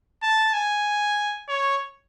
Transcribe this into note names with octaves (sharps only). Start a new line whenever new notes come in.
A5
G#5
C#5